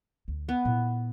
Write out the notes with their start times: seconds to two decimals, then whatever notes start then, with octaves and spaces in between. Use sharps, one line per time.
0.28 D2
0.49 B3
0.65 A#2 E4